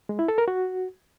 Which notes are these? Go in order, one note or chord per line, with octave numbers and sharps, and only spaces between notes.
G#3
E4
A4
A#4
F#4